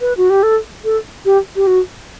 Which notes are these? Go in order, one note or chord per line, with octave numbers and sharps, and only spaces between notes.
B4
F#4
G4
A4
A4
G4
G4
F#4